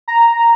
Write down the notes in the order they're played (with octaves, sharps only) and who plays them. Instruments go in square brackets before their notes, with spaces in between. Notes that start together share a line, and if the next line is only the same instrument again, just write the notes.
[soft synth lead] A#5